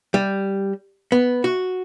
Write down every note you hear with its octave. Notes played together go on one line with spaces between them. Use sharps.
G3
B3
F#4